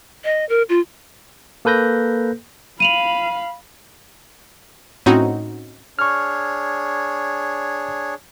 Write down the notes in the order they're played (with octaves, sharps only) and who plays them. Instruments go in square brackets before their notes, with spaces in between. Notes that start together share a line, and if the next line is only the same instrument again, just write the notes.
[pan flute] D#5
A#4
F4
[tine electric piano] A#3 A4 B4 G6 A#6
[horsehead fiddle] F5 B5 [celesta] D#7 F7 F#7
[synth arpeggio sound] A2 C4 C#4 D#4 F#4
[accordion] D4 G#4 C#5 [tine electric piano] C#6 F6